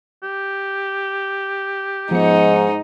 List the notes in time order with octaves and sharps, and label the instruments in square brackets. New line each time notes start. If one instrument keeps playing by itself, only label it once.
[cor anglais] G4
[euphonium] G#2 [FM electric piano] F3 B3 C#7 [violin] D#4